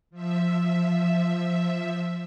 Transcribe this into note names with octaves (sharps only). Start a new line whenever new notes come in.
F3 E5